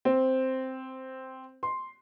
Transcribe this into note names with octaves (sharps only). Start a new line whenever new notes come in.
C4
C6